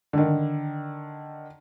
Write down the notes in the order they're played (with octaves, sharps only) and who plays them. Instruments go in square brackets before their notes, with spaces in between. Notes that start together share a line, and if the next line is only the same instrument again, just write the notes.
[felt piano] D3 D#3